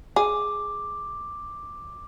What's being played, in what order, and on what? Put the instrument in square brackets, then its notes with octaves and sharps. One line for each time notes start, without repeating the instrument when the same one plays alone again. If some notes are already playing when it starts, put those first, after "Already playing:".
[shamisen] G#4 [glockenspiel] D6